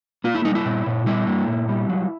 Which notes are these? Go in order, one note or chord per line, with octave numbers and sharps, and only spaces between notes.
A#3 F4
E4
G3 D#4
E4
A#2
A#2
G3 E4
A#3
A#2
G3
F#3